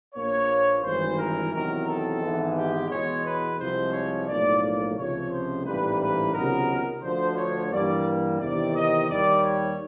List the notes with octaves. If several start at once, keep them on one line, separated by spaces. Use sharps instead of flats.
A#1 A#2 F3 A#3 C#5
G#1 G2 E3 C5
A#4
E2 C3 D#3 F#3 A#4
A4
G#1 G#2 E3 G#3 B3
G4
E2 B2 G#3 B3 C#5
B4
C2 C3 F3 G#3 C5
C#5
B1 A2 F3 A#3 D5
D5
C#2 C3 F3 C#5
C5
A1 G#2 E3 G3 A#3 B4
B4
C#2 C3 D#3 F#3 B3 A#4
D2 D3 F3 C5
C#5
G2 E3 G3 A#3 D5
E2 C3 D#3 D5
D#5
D#2 D#3 G3 D5
C#5